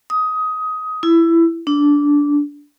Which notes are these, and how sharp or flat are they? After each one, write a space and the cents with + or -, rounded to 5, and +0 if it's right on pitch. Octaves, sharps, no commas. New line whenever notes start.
D#6 +15
E4 +15
D4 -15